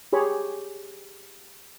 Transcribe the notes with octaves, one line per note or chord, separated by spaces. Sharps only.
G4 G#4 C#5 B5